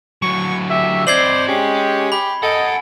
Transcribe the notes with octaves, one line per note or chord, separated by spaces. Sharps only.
D3 F#3 C#6
G4 E5
C4 C5 D5 D#5 G#6 C7 F#7
G#3 C#4 G4
G4 B5
A4 D#5 F#5 G#5